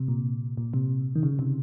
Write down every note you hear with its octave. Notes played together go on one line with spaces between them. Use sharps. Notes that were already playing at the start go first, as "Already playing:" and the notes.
Already playing: C3
A#2
A#2
C3
D#3
C#3
C3